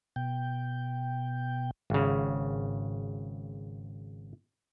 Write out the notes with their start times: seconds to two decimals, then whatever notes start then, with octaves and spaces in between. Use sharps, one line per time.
0.16 B2 G5
1.90 G#1 C#3